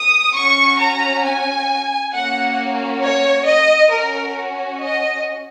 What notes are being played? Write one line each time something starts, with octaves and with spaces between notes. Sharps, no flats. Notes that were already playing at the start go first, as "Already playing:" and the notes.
Already playing: D#6
C#4 F#4 C#6
A#5
G#5
A#3 C#4 F#4 F#5
C#5
D#5
C#4 F#4 A#4
D#5